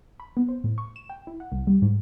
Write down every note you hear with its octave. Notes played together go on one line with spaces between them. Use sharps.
B5
B3
C5
A2
C#6
E7
G5
E4
F#5
C2
G3
G#2